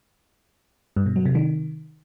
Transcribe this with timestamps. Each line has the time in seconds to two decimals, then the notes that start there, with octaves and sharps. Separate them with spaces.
0.96 G2
1.06 B2
1.16 F#3
1.25 C3
1.35 D#3